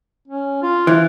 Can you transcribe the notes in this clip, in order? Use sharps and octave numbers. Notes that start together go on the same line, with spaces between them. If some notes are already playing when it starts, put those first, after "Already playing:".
C#4
F4
E3